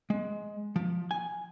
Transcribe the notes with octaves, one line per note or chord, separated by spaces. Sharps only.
G#3
F3
G#5